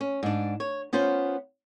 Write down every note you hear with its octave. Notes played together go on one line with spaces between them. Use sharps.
C#4
G#2 D4
C#5
B3 C#4 F4 C5